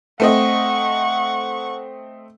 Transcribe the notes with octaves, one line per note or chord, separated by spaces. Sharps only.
A3 C4 D#5 F#5 C#6